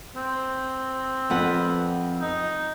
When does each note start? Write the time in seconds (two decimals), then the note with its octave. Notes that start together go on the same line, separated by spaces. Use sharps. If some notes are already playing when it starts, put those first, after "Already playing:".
0.16 C4
1.30 F2 B4 F#5
2.21 D#4